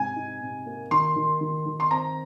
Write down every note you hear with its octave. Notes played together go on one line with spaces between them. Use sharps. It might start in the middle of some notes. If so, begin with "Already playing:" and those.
Already playing: G#2 C3 G#5
D#4
C3
A#3
D#3 C6
D#3
D#3
D#3
C6
C4 A#5